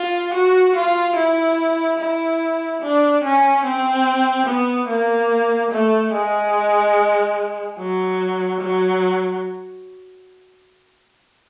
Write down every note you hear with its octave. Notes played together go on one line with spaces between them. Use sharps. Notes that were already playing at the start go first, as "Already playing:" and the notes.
Already playing: F4
F#4
F4
E4
E4
D4
C#4
C4
B3
A#3
A3
G#3
F#3
F#3